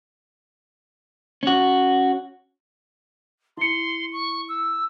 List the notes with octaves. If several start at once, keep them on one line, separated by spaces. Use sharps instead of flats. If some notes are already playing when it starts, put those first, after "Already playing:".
C#4 F#4
E4 C6 C#7
C#6
E6